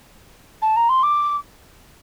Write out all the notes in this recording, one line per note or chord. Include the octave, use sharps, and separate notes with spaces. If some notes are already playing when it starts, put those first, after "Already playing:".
A5
A#5
C6
D6